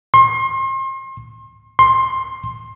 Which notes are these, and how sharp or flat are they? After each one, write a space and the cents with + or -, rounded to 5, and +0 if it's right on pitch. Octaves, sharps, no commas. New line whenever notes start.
C6 +35
C6 +15